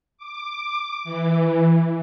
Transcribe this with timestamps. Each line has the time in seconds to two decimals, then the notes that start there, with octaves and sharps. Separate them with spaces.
0.18 D6
1.04 E3